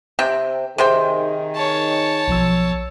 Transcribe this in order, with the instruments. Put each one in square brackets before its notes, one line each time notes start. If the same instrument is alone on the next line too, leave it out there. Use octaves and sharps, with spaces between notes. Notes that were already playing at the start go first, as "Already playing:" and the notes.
[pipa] C3 C4 G5
[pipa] C3 C5 G5 [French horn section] D#3 G#4
[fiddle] C#5 A5
[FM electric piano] B1 F3 E6